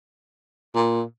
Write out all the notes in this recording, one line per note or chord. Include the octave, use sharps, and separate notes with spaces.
A#2